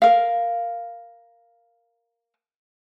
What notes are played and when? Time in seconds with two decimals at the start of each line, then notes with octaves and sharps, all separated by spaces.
0.02 A#4 F5